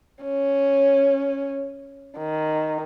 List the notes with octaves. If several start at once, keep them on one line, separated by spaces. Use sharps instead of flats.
C#4
D#3